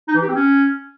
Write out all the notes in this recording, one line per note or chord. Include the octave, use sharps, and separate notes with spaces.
D#4
E3
G4
C4
C#4